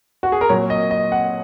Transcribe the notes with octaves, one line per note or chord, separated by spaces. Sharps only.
F#4
G#4
A#4
A#2 F#3 C#5
D#5
D#5
F#5